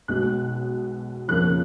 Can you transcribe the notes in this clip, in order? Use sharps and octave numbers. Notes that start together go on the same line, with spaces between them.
B1 B2 G#3 B3 F#6
F2 C#3 F3 A#3 F#6